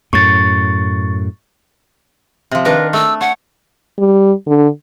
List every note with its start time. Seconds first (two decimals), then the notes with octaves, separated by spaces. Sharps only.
0.13 F#2 A2 C#6 A6
2.51 C3 F3
2.65 D#3 D4 A#4 B4
2.93 A3 E6
3.21 C#5 F#5
3.98 G3
4.47 D3